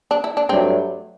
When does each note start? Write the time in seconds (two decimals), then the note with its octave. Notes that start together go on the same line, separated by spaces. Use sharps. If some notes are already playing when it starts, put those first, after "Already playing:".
0.11 D4
0.24 E4
0.37 D4
0.49 G2 F#3 A3 C4 D4